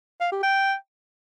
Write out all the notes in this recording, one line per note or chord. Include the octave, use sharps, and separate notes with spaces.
F5
G4
G5